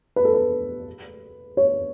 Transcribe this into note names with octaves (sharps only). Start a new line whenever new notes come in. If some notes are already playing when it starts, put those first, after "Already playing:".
B4
A4
B4
C#5